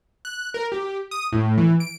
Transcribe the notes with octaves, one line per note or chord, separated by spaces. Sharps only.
F#6
A#4
G4
D#6
A2
E3
D7